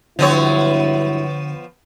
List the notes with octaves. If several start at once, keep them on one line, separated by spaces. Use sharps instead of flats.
G2 D3 F3 F#3 B3 E4 C#5